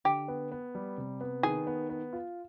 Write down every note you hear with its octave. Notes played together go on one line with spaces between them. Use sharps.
D3 G4
B3
B3
G3
C3
B3
D#3 G#4
B3
B3
F4